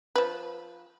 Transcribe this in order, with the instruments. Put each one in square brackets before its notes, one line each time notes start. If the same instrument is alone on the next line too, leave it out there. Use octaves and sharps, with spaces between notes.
[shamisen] F3 B4